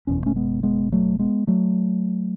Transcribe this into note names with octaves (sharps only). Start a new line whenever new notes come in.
F#1 E2 B2 C#4
A3 C#4
G#3 B3
G#3 B3
F#3 A3
G#3 B3
F#3 A3